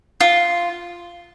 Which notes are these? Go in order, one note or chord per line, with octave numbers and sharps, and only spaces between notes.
F4